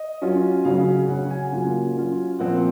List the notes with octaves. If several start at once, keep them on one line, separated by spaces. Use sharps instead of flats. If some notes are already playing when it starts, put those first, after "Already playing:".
Already playing: D#5
F#3 C#4 F4
C#3 F#3 C#4 F5
C#3 F#3 C#4 F#5
G#5
C#3 F#3 A#3 F4
F#3 C#4 F4
A#2 F3 C4 F#5